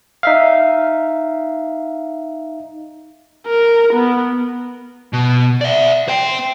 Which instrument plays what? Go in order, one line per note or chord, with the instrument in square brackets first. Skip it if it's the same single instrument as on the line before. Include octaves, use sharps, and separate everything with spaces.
[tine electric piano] D#4 E5 F5
[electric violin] A#4
B3
[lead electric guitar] B2
D5 E5
C5 G5